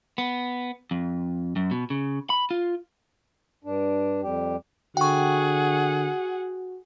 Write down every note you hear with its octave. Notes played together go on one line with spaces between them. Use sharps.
B3
F2
F#2
B2
C#3
B5
F4
G2 D4
F2 G3 G4
D3 F#4 G#4 F#5 G5 C#6